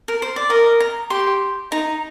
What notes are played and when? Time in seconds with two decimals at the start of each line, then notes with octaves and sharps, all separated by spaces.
0.08 A#4
0.22 C5
0.36 D5
0.49 A#4 D#5
0.80 A#5
1.10 G4 C6
1.72 D#4 A#5